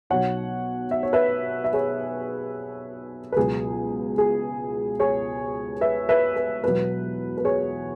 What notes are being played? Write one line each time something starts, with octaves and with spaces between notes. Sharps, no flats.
B1 B2 F#3 C#5 F#5
E5
C#5
B4 E5
E5
G#4 C#5
B4
C#2 B2 F#3 G#4
G#4
G#4 C#5
B4 E5
B4 E5
B4
E1 E2 B2 F#3 B4
B4
G#4 C#5